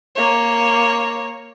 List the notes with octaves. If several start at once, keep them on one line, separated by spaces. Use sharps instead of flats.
A#3 C#5